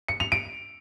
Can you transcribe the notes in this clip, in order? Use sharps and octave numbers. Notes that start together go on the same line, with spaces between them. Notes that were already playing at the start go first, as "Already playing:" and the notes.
C#7
F7
D7